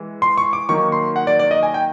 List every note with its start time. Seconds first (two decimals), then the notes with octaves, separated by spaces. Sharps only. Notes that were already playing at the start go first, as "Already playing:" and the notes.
Already playing: E3 G#3
0.22 C6
0.38 C#6
0.53 D6
0.69 D#3 F#3 A#3 D#4 C#6
0.92 C6
1.16 F#5
1.27 D5
1.39 D5
1.51 D#5
1.63 G#5
1.74 G5